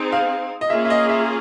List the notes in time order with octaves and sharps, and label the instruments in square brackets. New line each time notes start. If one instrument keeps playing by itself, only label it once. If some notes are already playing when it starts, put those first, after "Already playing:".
Already playing: [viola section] C4 D#4 G#4
[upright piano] F5
D#5
[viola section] A#3 C#4 F4 G#4 [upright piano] E5
[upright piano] E5
D#5
E5